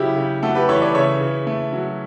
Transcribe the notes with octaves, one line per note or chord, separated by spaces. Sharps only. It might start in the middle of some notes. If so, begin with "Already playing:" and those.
Already playing: C#3 F#3 E4 G4
C#3
A3 F#4 A4
G4 B4
E3 A4 C#5
B4 D5
C#3 C#5 E5
C#3
A3
F#3